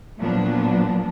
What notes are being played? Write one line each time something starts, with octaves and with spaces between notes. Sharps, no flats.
A#2 F3 F#3 B3 D4